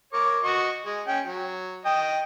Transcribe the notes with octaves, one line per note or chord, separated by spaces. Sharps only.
A#4 C#5 D6
F#4 D#5 C#6
G#3
C#4 G5
F#3
D#5 G5